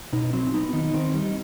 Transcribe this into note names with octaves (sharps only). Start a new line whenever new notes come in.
B2 D#4
F#3 C4
B3 D#4
D#3 D#4
D#3 C4
G3 D#4